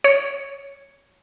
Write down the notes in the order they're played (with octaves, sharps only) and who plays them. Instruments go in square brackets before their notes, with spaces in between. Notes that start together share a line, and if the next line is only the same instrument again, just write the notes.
[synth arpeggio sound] C#5